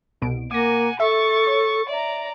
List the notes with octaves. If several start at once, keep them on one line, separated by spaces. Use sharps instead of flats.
C2 B2 D7
A#3 F#5 G#5 D6 A#6
A4 E5 C#6 A6
C#5
D5 E5 A#5